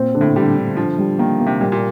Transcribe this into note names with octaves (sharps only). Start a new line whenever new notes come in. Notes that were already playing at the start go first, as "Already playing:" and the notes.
Already playing: A#2 C4
D3
A2
D3 G3
D3
D3 F3
G3
D#3 A#3
A#3
C3
A#2 G3
A#2